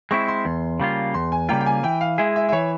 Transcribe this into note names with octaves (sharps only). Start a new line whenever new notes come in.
G#3 C4 E4 C#6
C6
E2
C#3 G3 A#3 F4
E2 C6
G#5
C#3 G3 A#3 F4 G5
G5
G#5
E3 G5
F5
G#3 E4 G#4 E5
E5
E5
E3 C#5